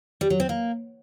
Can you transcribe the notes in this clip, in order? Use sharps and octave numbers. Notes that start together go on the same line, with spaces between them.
G3
F#3
C4
A#3